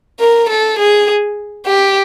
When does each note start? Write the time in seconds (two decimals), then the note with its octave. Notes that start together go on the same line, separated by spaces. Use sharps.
0.20 A#4
0.49 A4
0.79 G#4
1.66 G4